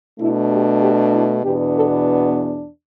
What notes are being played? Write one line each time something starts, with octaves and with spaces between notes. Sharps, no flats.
B2 A3 D4 E4
G4
G4
E4
E2 B2 B3 D4 G4
A4